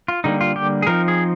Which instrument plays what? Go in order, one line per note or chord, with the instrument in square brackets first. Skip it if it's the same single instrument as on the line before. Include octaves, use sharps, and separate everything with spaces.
[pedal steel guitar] F4
D3 G3 A#3 D#4
F4
G4
G#4
F3 C4 D#4 A#4
G#4